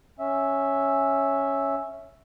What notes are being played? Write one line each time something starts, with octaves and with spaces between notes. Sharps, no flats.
C#4 E5